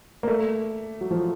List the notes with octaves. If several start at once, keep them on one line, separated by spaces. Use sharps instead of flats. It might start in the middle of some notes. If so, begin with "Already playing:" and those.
A#3
A3
F#3
F3